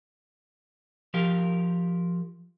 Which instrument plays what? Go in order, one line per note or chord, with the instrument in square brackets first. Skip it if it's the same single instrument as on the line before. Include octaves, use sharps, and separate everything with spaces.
[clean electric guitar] F3 G4 A#4 F5